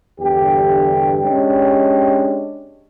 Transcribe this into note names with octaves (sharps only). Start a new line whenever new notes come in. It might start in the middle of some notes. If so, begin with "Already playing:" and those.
E2 G2 D3 G4
G#3 C#4 D4 G4